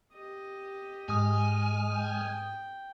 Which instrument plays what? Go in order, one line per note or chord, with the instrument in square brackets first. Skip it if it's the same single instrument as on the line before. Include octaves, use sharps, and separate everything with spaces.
[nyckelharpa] G4 D#5
[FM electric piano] G#2 D#6 [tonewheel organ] G#3 F6 [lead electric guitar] G#5
[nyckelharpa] G5